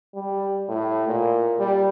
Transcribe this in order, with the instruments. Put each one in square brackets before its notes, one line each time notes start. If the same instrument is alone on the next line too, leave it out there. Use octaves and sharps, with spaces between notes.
[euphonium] G3
A2
A#2
G3